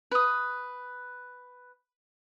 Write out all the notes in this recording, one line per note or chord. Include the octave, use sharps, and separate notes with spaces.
B4 D#6